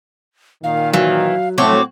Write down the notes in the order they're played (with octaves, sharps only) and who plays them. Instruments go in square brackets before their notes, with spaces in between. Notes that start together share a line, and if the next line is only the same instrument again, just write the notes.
[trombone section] A#2 D#3 [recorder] F5
[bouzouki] E3 [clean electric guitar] F#3 [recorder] F5
[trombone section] A2 A3 [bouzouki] C4 F#4 C#5 [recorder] D6